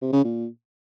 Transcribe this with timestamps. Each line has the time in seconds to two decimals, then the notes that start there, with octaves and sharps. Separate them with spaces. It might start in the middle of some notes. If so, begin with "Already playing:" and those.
0.02 C3
0.13 C#3
0.24 A#2